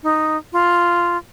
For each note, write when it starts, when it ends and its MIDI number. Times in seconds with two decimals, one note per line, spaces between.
0.03 0.37 63
0.52 1.17 65